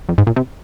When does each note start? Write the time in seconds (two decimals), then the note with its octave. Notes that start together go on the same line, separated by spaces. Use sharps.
0.09 F2
0.18 G#2
0.27 A#2
0.36 C3